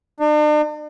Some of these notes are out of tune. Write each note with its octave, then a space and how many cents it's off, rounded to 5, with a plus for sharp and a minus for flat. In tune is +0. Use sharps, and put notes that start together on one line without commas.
D4 +45